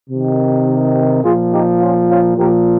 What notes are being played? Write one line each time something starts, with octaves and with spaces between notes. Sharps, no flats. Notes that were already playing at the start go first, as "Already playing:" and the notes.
C3 D#3
A#2 F3 F4 G#4
D#4 G4
C#4 F4
C#4 F4
A#2 F3 G4 A#4